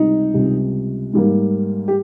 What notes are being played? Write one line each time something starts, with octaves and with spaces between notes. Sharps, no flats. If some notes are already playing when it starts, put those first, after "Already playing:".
Already playing: C#2 C3 G3 D#4
C#2 C3 G3
G#2 G3 A#3
G4